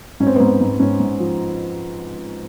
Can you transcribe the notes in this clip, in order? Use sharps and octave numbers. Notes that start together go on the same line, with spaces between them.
G#2 C#4
C4
B3
G#2 C4
G#2
G#2 C#4
G#2
F3